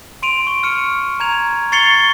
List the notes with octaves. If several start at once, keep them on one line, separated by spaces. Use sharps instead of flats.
C6 D7 D#7 F7
C#6
F6 C#7 D#7
A#5 G#6 F7
C#6 A6 C7 C#7 F7 G7